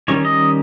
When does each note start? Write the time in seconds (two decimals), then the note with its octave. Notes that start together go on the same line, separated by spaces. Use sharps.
0.08 D#3 G3 C#4 C#5
0.25 D#5